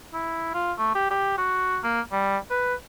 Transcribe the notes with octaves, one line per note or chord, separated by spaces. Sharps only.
E4
F4
A3
G4
G4
F#4
A#3
G3
B4